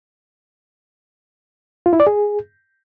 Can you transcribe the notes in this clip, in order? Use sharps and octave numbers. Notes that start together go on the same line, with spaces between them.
F4
E4
D5
G#4